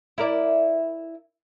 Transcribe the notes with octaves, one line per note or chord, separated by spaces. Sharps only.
E4 A#4 D5